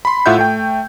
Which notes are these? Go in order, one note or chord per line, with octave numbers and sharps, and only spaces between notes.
B5 C6
A2 F4 E5 F#5 G6
A3 G5